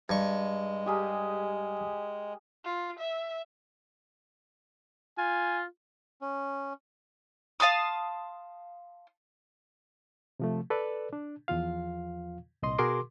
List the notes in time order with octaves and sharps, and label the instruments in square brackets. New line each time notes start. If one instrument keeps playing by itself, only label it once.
[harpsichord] G2 C#6 [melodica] G#3
[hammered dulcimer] G4 G#4 A#4
[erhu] F4
E5
[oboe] F4 [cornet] G#5
[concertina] C#4
[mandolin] F5 A5 C6 D#6
[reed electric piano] C3 F3 A3
A4 B4 D5
D4
E2 F3 F4 F5
C2 A#2 D#5 C6
B2 F#4 G#4 A#4 C6 D6